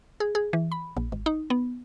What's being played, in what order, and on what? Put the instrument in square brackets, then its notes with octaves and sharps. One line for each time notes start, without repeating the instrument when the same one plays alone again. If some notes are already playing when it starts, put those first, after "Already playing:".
[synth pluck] G#4
G#4
E3
B5
A#1
G#1
D#4
B3